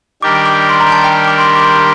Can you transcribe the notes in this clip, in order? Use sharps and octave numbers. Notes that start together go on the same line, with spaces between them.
D#3 G3 D4 G4 A#4 D6
D6
C6
A#5
A5
G5
D6
C6
D6
C6